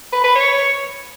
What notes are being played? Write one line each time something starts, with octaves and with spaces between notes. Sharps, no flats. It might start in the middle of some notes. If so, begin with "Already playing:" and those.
B4
B4
C#5